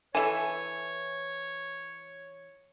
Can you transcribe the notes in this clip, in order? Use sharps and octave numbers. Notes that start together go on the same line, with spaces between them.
E3 E4 A4 C#5 E5 G#5